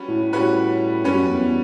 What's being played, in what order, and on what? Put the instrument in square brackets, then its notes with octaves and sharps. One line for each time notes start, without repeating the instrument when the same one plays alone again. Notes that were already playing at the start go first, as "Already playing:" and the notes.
Already playing: [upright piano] G3 C#4 F#4 B4
[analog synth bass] A2
[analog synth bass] A2 [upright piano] G3 C#4 F#4 B4
[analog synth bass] F#2 [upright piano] G3 C#4 F#4 B4
[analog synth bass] E2